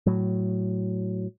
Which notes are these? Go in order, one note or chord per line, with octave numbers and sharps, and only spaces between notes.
A2 F#3